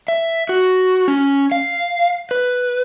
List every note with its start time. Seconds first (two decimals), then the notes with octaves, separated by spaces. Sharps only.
0.08 E5
0.49 F#4
1.08 C#4
1.52 F5
2.31 B4